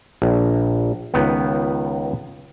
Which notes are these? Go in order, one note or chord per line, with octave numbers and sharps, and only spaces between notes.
A#1
C#2 D#3 B3